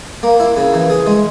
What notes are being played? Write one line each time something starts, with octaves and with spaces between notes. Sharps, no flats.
A#3
E4
C#3
E3
G#4
G#3